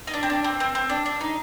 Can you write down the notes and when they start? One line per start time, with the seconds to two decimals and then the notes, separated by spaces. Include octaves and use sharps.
0.07 D#4
0.14 D4
0.23 C4
0.30 D4
0.44 C4
0.60 C4
0.75 C4
0.90 D4
1.06 D4
1.21 D#4